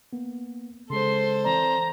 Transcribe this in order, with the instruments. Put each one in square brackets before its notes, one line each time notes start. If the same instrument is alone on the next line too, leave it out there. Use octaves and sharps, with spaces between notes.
[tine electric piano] A#3 B3
[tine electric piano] C#3 G#3 [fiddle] A4 C5 [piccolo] C6
[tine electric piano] E3 C4 D5 [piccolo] A#5